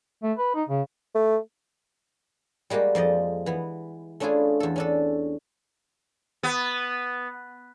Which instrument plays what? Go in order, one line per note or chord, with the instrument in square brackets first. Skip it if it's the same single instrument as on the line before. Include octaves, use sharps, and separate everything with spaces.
[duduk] A3
B4
D#4
C#3
[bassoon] A3
[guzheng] G3 G#3 A#3 F#4 G4
F2 F3 D5 D#5
E3 B3
A3 C#4 D4 E4 F4 G#4
E2 A4
C#4 D4 A4
[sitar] B3